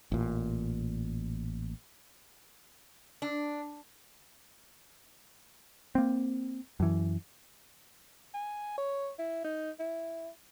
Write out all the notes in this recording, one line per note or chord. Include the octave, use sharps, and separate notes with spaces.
A1 A#2
D4
A#3 C4
F#2 E3
G#5
C#5
E4
D#4
E4